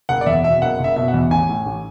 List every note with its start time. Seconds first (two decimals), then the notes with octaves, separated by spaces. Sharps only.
0.09 F#1 F#5
0.21 D5
0.26 E2 E5
0.44 B2 E5
0.61 F#1 F#5
0.79 F#1 E5
0.96 B2 E5
1.08 F#5
1.14 E2
1.31 A1 G#5
1.49 A2
1.65 A1